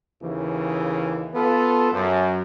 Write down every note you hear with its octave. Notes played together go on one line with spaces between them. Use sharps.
D#2 C#3 E3
B3 F4 A4
F#2